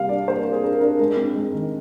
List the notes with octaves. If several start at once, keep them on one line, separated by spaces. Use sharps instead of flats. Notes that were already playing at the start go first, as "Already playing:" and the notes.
Already playing: C3 G3 A#3 F5
D4 D5
A#3 C5
A#4
A#3
G#4
D4 A#4
D4 A#4
G#3 A#4
C4
G#3
D#3